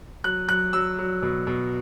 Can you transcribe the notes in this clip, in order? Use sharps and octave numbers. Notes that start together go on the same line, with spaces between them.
F#3 F#6
F#3 F#6
F#3 E6
F#3
B2
B2